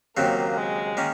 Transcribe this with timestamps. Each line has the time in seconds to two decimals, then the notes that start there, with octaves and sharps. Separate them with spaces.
0.17 D#2 C#3 F#3 A#3 C4
0.57 G#3
0.97 D#3 A#3 C#4